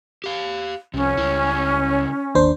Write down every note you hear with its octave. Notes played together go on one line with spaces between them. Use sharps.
G4 F5
C2 C3 F3 C#4
C#2 C#3 G3 E4
G1 D#2 D4 C5